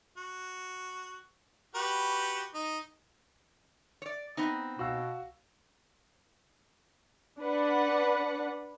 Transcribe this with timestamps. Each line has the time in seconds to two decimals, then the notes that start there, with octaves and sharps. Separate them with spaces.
0.17 F#4
1.75 F#4 G4 B4
2.54 D#4
4.02 C#5 D5
4.37 B3 C4 D#4
4.79 B2 F#4 F5 E6
7.40 D4 B4 F#5